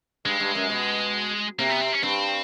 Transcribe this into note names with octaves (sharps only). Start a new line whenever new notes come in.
G2 G#3
G2
F#2
B2
C3 A#3
B3
C4
C#4
G2 C4